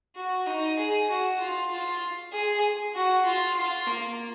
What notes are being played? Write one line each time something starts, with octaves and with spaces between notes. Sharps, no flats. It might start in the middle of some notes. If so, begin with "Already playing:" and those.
F#4
D#4
G#4
F#4
F4
F4
G#4
F#4
F4
F4
A#3